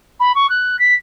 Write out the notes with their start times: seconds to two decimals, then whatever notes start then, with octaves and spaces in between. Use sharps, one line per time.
0.20 B5
0.35 C#6
0.50 F#6
0.79 B6